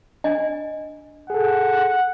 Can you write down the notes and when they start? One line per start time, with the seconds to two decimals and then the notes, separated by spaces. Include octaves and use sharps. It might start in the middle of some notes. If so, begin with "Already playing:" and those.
0.24 D4 D#5 G#5
1.30 G#4 A4 F#5